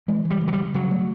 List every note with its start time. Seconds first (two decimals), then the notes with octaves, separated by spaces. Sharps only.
0.08 E3 G#3
0.25 E3
0.30 G3
0.41 C#3
0.48 F#3
0.53 G3
0.58 C#3
0.74 C#3 F#3
0.91 A3